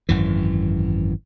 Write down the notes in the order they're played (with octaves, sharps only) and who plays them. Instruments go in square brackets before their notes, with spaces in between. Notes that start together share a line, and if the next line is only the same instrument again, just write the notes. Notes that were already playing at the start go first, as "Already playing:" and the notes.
[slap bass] G#1 F#2 E3